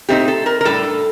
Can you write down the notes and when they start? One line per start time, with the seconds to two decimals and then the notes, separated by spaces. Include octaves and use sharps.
0.09 A#2 A3 C4 D#4 G4
0.28 A4
0.46 A#4
0.61 A#4
0.65 A2 G3 D4 A4